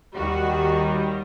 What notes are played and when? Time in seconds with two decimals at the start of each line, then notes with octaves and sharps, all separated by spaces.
0.17 D#2 D#3 G3 F#4